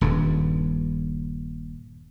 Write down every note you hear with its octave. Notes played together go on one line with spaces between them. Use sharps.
D#1 G2